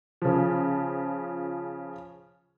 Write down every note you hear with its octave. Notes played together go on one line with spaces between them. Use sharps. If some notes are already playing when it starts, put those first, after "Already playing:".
C#3 F3